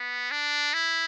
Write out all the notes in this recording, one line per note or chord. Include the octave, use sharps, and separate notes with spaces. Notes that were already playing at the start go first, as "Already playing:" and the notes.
Already playing: B3
D4
E4